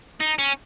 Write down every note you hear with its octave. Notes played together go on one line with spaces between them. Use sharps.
D#4
C#4